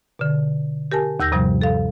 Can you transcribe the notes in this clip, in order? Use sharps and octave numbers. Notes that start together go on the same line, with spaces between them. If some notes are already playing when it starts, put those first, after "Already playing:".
B2 D3
G4 A#4 G#5 A5
D#2 E6 G6 A#6
G2 C3 F3 G3
A4 F5